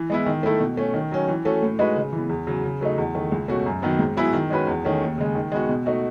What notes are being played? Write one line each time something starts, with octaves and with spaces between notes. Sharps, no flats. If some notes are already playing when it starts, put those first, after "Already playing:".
Already playing: E3
G#3 B3 E4
D#3
A3 E4 A4
B2
A3 C#4
D#3
F#3 C#4
E3
A3 C#4 F#4 A4
A2
G#3 D#4 F#4 B4
C#3
E3 B3
E2
C#3 F#3
C#3
F#3 A3 D#4
E2
D#3 A3
C#2
B2 A3 C#4 F#4
F#2
D#3 F#3 B3
G#2
F#3 B3 E4 G#4
D#3
G#3 C#4 F#4 B4
E2
D#3 A3 C#4
D#2
C#3 G#3
D#3
G#3 B3 F#4
B2
A3 D#4 F#4